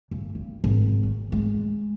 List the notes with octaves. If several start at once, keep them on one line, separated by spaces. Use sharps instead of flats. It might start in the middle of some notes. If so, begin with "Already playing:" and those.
G1
G2
G#1
F#3
G#3